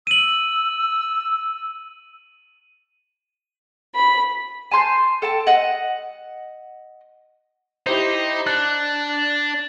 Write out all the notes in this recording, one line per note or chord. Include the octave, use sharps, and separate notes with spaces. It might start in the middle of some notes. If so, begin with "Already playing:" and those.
E6 D#7 F#7
B5
G#5 A5 C6 G6
A4 G5 A5
D#5 F#5
D#4 E4 G4 C5
D4 F#6